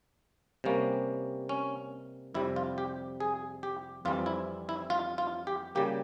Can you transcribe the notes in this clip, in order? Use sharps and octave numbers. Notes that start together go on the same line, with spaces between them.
C3 G3 A#3 C#4
C#4
F2 C3 G3 E4
F4
G4
G#4
G4
F2 E3 G3 C4 F4
E4
E4
F4
F4
G4
C#3 G3 A#3 G4